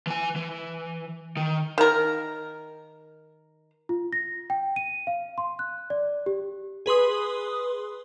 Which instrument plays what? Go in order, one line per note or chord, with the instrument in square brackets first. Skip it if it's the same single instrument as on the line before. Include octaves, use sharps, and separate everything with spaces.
[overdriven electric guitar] E3 G#5
E3
D#3
[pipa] D#3 A#4
[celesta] F4
A#6
G5
D#7
F5
C6
F#6
D5
G4
[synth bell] G#4 B4 C6 D#6